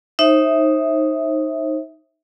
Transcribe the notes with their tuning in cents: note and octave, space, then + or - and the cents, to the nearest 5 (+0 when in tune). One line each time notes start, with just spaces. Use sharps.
D#4 +0 C5 +35 E5 -10